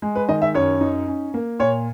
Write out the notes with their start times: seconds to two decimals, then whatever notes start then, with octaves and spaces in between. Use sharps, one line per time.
0.02 G#3
0.15 B4
0.29 D#3 D#5
0.42 E5
0.55 F#2 C#5
0.81 D#4
1.07 C#4
1.34 A#3
1.60 A#2 C#5